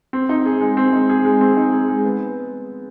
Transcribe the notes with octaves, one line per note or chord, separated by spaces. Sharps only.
C4
D#4
G#4
G#3
C4
D#4
G#4
G#3
C4
D#4
G#4
G#3
B3